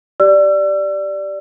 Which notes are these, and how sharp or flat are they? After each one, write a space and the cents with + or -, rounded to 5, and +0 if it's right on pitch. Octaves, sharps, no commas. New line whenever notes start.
G4 -10 D5 +0 E6 +40